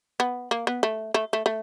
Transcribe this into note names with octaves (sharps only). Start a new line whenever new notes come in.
B3
A#3
B3
A3
A3
A3
A3